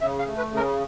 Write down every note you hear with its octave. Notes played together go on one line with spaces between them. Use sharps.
C#3 E5
F5
A3
B4
C#3
A#4